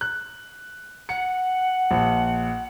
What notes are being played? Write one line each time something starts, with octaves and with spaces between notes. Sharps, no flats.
F#6
F#5 C#7
A#1